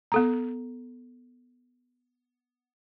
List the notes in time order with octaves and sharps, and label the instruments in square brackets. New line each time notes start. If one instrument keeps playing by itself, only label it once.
[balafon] B3 A4 A#5